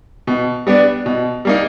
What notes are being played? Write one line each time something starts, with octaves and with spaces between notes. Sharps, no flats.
B2
G3 B3 D4
B2
G3 A#3 D#4